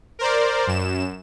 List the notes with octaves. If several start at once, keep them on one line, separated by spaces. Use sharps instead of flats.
A#4 C5 D5
F#2 E7